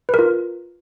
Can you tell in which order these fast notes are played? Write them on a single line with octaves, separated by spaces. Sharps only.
B4 A#4 F4